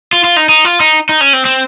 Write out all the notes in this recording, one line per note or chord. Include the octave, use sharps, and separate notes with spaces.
F4
F4
D#4
D#4
F4
D#4
D#4
C#4
C4
C4